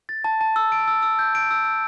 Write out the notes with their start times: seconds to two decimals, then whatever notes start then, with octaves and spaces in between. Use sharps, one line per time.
0.09 A6
0.24 A5
0.41 A5
0.56 E6
0.72 D7
0.88 E6
1.02 E6
1.19 G6
1.35 D7
1.50 E6
1.65 E6